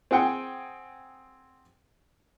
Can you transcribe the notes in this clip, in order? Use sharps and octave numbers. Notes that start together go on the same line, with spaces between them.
C4 G#4 F#5 G5